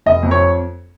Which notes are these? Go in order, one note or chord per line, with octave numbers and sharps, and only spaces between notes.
F1 D#5
F2
C#5